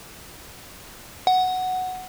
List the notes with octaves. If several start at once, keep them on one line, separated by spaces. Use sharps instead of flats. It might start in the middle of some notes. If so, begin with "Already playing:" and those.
F#5